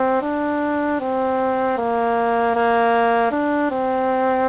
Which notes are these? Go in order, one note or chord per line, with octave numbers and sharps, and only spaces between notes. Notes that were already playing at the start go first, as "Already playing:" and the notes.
Already playing: C4
D4
C4
A#3
A#3
D4
C4